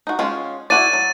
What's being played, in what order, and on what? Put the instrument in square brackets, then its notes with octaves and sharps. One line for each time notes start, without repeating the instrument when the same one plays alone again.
[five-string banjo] D#4 F#4
G#3 C#4 F4
[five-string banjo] E4 F#4 D5 [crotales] A6 D#7
[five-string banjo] F#3